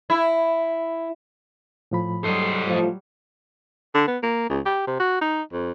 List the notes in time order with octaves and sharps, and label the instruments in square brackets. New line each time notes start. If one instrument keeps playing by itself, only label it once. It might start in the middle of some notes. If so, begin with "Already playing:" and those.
[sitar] E4
[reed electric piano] A2 F3 B5
[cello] F#3 G3 [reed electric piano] A4 [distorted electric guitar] C5 D#5
[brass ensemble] A2 F3
[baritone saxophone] D3
B3
A#3
C#2
G4
C3
F#4
D#4
F2